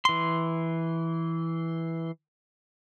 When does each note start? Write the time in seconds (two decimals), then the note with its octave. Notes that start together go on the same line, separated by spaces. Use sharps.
0.05 E3 C6